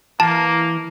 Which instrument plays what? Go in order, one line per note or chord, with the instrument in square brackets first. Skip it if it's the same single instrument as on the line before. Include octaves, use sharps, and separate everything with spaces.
[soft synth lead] E3 [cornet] A#3 [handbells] A5